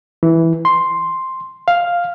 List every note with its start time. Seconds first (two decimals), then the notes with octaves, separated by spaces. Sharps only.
0.23 E3
0.65 C6
1.68 F5